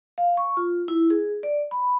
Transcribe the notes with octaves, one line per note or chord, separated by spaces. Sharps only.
F5
C#6
F4
E4
G#4
D5
B5